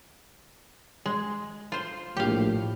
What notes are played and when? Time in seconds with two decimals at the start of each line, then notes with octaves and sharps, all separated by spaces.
1.06 G#3
1.72 F4 C5
2.17 A#1 A2 G4 F5